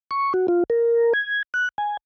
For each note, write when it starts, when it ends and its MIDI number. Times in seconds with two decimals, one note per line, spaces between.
0.11 0.33 85
0.34 0.47 66
0.48 0.64 65
0.70 1.13 70
1.14 1.43 92
1.54 1.69 90
1.78 1.97 80